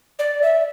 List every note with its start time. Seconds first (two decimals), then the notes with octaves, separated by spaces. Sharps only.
0.19 D5
0.42 E5